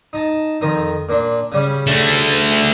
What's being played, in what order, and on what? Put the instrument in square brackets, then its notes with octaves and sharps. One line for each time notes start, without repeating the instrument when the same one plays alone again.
[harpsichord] D#4 A5
F2 D#3 D#4
A#2 D4
C#3 G3 C#4
[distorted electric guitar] D3 A3